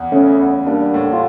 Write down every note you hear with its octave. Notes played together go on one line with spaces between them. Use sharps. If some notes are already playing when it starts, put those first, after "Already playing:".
Already playing: E2
C#3 A3 C#4
E2
G3 A#3 D4
A2
F4